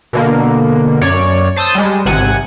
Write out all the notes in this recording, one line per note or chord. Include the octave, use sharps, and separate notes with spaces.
B2 D3 A#3
F#2 C#5 D5
C5 A5 D#6 E6 G6
G3 G#3
G#1 C3 F#5 G#5